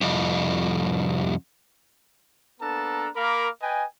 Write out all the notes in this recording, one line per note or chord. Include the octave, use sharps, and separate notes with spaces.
C2 F2
A#3 B3 D4 A4 A5 A#5
A#3 A#4 F5 B5 D6
B4 D#5 G5 G#5